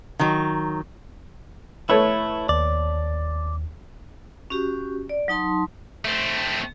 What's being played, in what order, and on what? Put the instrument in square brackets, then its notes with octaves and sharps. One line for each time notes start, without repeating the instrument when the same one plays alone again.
[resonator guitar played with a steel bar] D#3 F#3
[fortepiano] A3 B4 C#5 [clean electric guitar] E4
[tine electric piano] D#2 [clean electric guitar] D5
[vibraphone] C#4 F#4 G4
D5
F#3 D#4 A5 C6
[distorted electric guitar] A3 C4